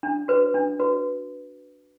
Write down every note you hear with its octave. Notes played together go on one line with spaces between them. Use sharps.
D4
F#4 B4
D4
F#4 B4